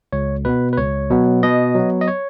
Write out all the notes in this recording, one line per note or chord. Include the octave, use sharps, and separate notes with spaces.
C#2 C#5
B2 B3 B4
B4
C#2 C#5
B2 F#3 B3
B2 D#5
F#3 B3
D#5
C#5